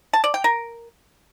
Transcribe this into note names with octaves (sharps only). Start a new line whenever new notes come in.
A5
D5
G5
A#4